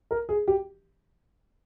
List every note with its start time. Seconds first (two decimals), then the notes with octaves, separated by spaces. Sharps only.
0.11 A#4
0.29 G#4
0.48 G4